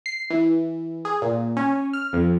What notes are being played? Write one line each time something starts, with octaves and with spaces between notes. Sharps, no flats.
C7
E3
G#4
A#2
C#4
F6
F2